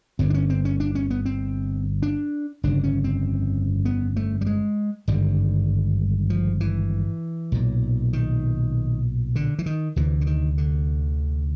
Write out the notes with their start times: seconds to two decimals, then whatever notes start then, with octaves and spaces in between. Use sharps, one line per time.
0.19 G1 G2 D3 C4
0.30 D4
0.34 C#4
0.50 C4
0.65 C#4
0.80 D4
0.95 C#4
1.11 B3
1.26 C4
2.03 D4
2.64 G1 F2 C#3 D4
2.84 C#4
3.04 C4
3.85 B3
4.16 A3
4.41 G3
4.46 G#3
5.08 G#1 G2 D3 G3
6.30 F3
6.60 E3
7.52 B1 A#2
8.13 D#3
9.36 D3
9.59 E3
9.66 D#3
9.96 D2 C3 E3
10.21 D3
10.27 D#3
10.58 D3